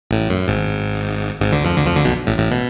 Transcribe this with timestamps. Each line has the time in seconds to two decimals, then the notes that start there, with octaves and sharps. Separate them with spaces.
0.11 A1 A2
0.30 F#2
0.48 G#1 G#2
1.41 G#1 G#2
1.52 D2 D3
1.64 F2 F3
1.77 D2 D3
1.87 F2 F3
1.96 D2 D3
2.04 B1 B2
2.27 A1 A2
2.38 A1 A2
2.51 B2